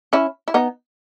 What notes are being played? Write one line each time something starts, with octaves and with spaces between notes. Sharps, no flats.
C#4 E4
E4
B3 D#4